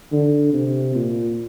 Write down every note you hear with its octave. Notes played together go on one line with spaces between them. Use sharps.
D3
C3
A#2